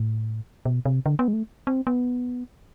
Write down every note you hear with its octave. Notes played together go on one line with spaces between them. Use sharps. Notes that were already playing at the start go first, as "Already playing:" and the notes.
Already playing: A2
B2
C3
D3
B3
G#3
A3
C4
B3